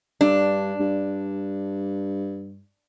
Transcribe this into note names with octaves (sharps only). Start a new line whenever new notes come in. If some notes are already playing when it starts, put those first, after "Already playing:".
G2 D4
G2